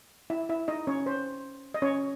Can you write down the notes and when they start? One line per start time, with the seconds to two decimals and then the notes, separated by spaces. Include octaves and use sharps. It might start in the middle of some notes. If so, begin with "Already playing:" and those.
0.30 E4 E5
0.49 E4 E5
0.68 D#4 D#5
0.87 C#4 C#5
1.06 C5
1.74 D#5
1.82 C#4 C#5